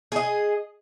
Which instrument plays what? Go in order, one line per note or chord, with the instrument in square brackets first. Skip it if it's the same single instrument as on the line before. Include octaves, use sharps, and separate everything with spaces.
[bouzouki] G#4 D#5